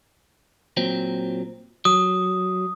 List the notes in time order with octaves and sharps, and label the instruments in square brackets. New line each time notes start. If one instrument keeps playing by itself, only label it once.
[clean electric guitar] A#2 F#3 C4
[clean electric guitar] F#3 [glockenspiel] D#6